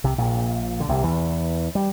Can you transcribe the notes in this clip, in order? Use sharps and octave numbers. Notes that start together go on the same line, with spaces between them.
C2 C3
A#1 A#2
D3
C2 C3
E2 E3
G3